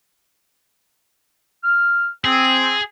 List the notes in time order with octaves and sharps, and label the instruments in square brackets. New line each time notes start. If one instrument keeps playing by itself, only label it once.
[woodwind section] F6
[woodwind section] C4 [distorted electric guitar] G#4